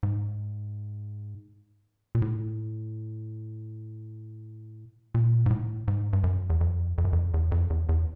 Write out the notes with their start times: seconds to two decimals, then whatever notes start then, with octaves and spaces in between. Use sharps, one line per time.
0.03 G#2
2.15 A#2
2.22 A2
5.15 A#2
5.46 G#2
5.51 A2
5.88 G#2
6.13 G2
6.24 F#2
6.50 E2
6.61 F2
6.98 F2
7.05 F#2
7.13 F2
7.34 E2
7.52 F2
7.70 E2
7.89 E2